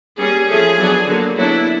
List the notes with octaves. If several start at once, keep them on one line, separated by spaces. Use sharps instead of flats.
G3 A#3 C#4 G#4
F3 A3 C#4 G#4
F#3 B3 D4
D3 F#3 A#3
F#3 B3 D4 E4